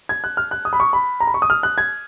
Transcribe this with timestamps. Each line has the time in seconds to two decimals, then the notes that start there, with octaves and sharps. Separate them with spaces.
0.09 G#6
0.24 F#6
0.37 F6
0.51 F#6
0.65 D#6
0.73 B5
0.80 C#6
0.93 B5
1.20 A#5
1.27 B5
1.34 C#6
1.42 D#6
1.50 F6
1.63 F#6
1.78 G#6